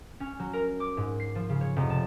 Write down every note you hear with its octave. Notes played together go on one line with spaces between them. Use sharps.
C#4
F#3
A#4
D6
G#2
C7
F3
C#3
C#5
F1
A5